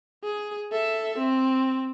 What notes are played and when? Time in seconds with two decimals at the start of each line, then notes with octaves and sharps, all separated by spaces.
0.24 G#4
0.72 A4 E5
1.19 C4